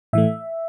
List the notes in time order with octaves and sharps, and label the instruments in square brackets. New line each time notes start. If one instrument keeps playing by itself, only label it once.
[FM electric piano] A2 E3 A3 E5